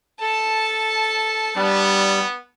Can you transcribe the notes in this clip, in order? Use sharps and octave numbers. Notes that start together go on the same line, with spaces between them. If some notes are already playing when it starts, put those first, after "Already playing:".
A4 A5
G3 B3 D4